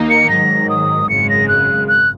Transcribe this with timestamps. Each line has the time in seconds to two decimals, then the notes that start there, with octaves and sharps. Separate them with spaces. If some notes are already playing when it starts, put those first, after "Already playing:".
Already playing: D#2 D#3 A#3 D#4
0.10 C#7
0.29 G#2 D#3 F#3 A#6
0.70 D#6
1.09 G#1 F#2 C#3 G#3 C#7
1.29 A#6
1.48 F#6
1.88 F#6